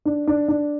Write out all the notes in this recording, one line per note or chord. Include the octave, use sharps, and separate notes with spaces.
D4
D4
D4